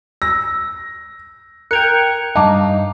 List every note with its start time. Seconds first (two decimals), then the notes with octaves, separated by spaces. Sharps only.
0.22 E6 A#6
1.71 A#4 G5 F#6 G#6 C#7 F7
2.36 G2 D#4 F5 A5 D6